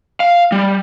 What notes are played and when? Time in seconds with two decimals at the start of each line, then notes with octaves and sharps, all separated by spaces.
0.20 F5
0.52 G3